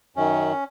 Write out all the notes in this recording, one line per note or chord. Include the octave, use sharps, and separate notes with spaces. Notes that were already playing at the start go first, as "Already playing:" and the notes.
F#2 D#3 C#4